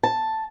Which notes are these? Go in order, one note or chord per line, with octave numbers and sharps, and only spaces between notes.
A5